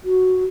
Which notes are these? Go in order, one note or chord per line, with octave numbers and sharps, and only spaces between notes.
F#4